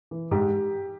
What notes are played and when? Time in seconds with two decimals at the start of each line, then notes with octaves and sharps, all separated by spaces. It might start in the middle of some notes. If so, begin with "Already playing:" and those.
0.11 E3
0.31 G#2 G4